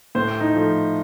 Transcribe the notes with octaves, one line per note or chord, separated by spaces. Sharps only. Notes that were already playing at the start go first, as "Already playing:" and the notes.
A2 C5
D#4
F3 A3